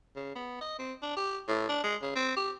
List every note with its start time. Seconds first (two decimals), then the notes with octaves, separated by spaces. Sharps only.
0.16 C#3
0.35 B3
0.61 D#5
0.79 C4
1.02 D4
1.16 G4
1.48 A2
1.69 D4
1.84 G#3
2.02 C#3
2.15 C4
2.36 G4